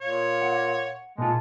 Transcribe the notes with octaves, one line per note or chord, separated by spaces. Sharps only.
A#2 C#5 F5
F#5
A#2 G#3 F4 A5